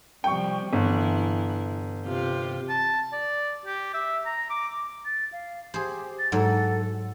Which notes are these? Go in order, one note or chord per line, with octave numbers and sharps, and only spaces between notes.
C3 F3 G3 G5 C#6
G1 E3 E4
C3 F4 G4
A5
D5
G4
E5
A#5
D6
A6
F5
G4 G#4 C5
A6
G#2 F#3 A4